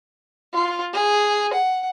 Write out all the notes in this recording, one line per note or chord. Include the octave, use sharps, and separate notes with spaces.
F4
G#4
F#5